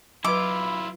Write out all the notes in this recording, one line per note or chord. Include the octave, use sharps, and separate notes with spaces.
F#3 E4 F4 B4 B5 D6